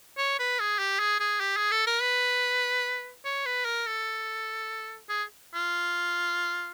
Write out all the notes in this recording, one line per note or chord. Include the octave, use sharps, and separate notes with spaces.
C#5
B4
G#4
G4
G#4
G#4
G4
G#4
A4
A#4
B4
C#5
B4
A#4
A4
G#4
F4